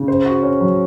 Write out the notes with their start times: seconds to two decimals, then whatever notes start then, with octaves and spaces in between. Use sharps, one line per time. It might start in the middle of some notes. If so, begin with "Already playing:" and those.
Already playing: C#3
0.08 C5
0.25 F#4
0.43 C#4
0.61 F#3